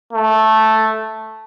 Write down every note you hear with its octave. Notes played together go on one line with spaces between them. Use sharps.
A3